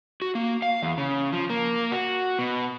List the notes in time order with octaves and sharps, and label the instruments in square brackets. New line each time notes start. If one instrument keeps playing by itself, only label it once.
[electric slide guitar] F#4
A#3
F5
E2
C#3
F3
A#3
F#4
B2